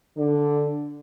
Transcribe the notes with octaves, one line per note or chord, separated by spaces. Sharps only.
D3